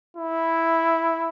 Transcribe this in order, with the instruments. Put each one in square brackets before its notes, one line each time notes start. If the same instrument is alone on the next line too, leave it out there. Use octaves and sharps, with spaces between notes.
[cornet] E4